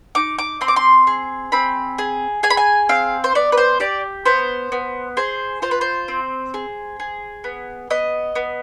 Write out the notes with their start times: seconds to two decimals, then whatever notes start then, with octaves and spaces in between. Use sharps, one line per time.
0.15 D#4 D6
0.38 D6
0.61 C4 C6
0.68 D6
0.76 C6
1.07 G#4
1.52 C4 B5
1.98 G#4
2.43 G#4 G#5
2.50 B5
2.57 G#5
2.89 C4 F5
3.24 C5
3.35 B3 D5
3.52 B4
3.58 C5
3.80 G4 D5
4.25 B3 C5
4.72 B3
5.17 G#4 C5
5.62 F4 C5
5.71 B4
5.81 C5
6.08 C4
6.54 G#4
7.00 G#4
7.44 B3
7.90 B3 D#5
8.35 B3